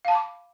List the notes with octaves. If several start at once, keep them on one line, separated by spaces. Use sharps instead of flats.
F5 A5 B5 D6